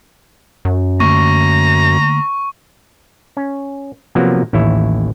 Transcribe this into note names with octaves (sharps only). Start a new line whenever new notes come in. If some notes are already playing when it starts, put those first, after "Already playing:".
F#2
D3 A3 A#3 A#5 C#6
C#4
C3 F3 F#3 A#3 B3
A1 D#2 E4 C#5 E5